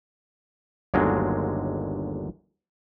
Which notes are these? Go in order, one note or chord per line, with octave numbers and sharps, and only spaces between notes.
G1 D#2 D3 F#3 G#3 F4